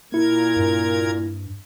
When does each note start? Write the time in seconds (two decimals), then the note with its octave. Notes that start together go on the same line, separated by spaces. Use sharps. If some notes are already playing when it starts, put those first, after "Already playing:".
0.12 A#2 A#3 E4 A#4 G#6
0.57 G2